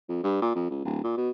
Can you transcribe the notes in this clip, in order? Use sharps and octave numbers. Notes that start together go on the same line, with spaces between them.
F2
G2
A#2
F2
C#2
D1
A#2
B2